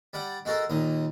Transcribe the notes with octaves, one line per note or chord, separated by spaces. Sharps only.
G3 D5 F#5
G#3 F#4 A4 A#4
D#2 A#2 D#5